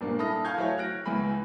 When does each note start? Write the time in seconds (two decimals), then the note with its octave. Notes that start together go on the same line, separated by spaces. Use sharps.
0.01 G#1 G2 A#2 A#3 D4
0.19 E4 A4 B5 D#6 F6 A#6
0.45 F5 G#5 A5 C#6 G6 G#6
0.58 F#3 A3 E4 C#5
0.78 F6 F#6 A#6 D7
1.06 C#2 E3 G#5 B5